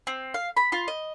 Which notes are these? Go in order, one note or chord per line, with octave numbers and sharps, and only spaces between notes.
C4
F5
B5
F4
D#5